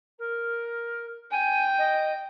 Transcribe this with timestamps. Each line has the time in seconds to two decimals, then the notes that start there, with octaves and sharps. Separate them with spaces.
0.19 A#4
1.31 G5 G#5
1.78 D#5